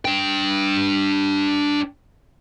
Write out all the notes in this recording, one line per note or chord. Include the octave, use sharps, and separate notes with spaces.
D4 G5